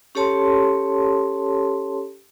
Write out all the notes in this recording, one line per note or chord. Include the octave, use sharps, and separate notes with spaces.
C#4 G4 A4 C#5 A5 C6